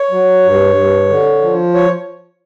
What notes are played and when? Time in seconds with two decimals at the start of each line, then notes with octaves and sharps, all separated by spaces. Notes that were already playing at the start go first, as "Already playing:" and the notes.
Already playing: C#5
0.11 F#3
0.43 G2
0.75 G2
1.09 D3
1.42 F3
1.74 C#5